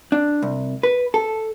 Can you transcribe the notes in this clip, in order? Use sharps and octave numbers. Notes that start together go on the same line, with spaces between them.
D4
C2
B4
A4